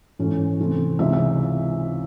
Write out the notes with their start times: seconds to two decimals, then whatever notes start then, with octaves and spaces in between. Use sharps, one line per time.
0.19 G#2 E3 A3 C#4 E4
0.59 C3 E3 A3 C4
0.99 C#2 C3 E3 G#3 D#4 E5
1.13 E5